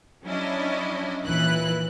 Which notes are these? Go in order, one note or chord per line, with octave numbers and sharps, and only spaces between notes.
F#3 C#4 D4 E4 D#5
D#2 A#2 E3 E4 B4 F#6